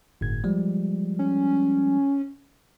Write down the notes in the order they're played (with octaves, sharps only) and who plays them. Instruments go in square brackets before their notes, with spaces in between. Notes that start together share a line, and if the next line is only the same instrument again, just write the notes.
[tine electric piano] G1 A2 G#6
F3 G3 G#3
[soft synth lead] C#4